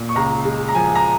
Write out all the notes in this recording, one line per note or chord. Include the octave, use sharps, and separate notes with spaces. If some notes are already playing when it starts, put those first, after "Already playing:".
Already playing: A#2
C#6
C#2 A#5
G#3
A#5
F3 G#5
A#5